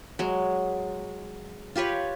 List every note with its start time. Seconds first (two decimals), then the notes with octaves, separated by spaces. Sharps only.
0.19 F#3 G#3
1.76 F4 G4 B4 C#5